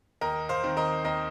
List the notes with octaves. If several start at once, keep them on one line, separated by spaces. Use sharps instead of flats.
D#2 A#4 D#5
C5 F5
D#3 C4
A#4 D#5
D#2 A#4 D#5